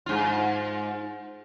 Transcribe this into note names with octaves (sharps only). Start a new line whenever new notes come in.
G#2 F4